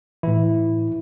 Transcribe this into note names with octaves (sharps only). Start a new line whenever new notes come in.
A2 E3 E4